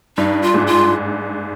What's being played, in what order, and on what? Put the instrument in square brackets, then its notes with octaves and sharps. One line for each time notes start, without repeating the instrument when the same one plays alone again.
[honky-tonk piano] G2 [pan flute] D#4
[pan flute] F4
[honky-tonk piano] G#2
[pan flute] F4